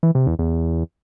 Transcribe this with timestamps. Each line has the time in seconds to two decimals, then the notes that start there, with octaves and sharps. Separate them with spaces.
0.03 E3
0.15 C3
0.27 E2
0.39 E2